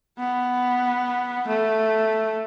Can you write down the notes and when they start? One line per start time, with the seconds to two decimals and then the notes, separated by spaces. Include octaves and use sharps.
0.19 B3
1.48 A3